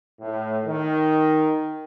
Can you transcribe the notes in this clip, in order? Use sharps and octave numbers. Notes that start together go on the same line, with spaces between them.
A2
D#3